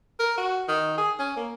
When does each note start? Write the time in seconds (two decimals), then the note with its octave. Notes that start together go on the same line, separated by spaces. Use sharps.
0.19 A#4
0.37 F#4
0.68 D#3
0.98 G#4
1.19 C#4
1.36 A#3